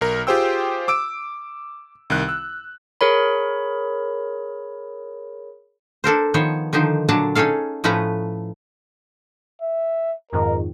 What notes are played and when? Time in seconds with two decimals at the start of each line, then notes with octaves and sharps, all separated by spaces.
0.01 B1 A#4
0.27 F4 G4 G#4 C5 G5 E6
0.88 D6 E6 D7
2.10 C2 D#3 F#6
2.28 E6
3.01 G#4 A#4 C#5 B5
6.04 D4 A4 A#4 C5
6.34 D#3 F3 B3 C5 C#5
6.73 D3 D#3 F3 D#4 C5
7.09 A#2 D3 F#3 D4 A5 A#5
7.35 C#4 D#4 G#4 A4 F5
7.84 A2 F3 A3 C#4 B4 A#5
9.62 E5
10.32 F2 G#2 D#3 A#4